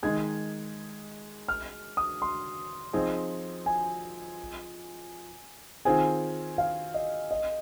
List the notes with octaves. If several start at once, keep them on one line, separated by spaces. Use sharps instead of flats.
D#3 G#3 D#4 G#4 G#6
F6
D#6
C6
F3 C4 D#4 G#4
G#5
D#3 C4 F4 G#4 G#5
F5
D#5
D#5